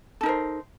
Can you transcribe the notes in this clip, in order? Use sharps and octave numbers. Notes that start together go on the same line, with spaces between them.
D#4 A4 A#4 C5